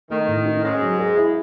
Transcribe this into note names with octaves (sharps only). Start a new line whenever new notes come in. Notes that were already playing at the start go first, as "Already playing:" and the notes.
D#3 A3
A2
D#4
G#2 G#3 C#4
F#3
G#4
E4